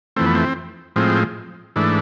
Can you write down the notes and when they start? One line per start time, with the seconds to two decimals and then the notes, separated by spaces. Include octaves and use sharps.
0.16 F2 E3 A3 C4
0.26 B3
0.35 C4
0.96 A2 F3 G#3 C4
1.76 G#2 E3 A3 D4